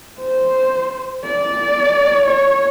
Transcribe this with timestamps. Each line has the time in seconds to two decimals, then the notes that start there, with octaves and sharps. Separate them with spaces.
0.21 C5
1.25 D5
2.25 C#5